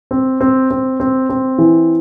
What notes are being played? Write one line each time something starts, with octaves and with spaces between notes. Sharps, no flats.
C4
C4
C4
C4
C4
E3